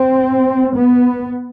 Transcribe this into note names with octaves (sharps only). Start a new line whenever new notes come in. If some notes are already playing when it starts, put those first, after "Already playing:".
Already playing: C4
B3